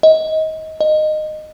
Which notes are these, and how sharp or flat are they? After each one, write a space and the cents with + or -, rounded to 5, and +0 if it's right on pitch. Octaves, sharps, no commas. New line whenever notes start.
D#5 +25
D#5 -15